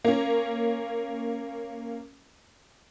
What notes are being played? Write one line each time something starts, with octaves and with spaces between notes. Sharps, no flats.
A#3 C#4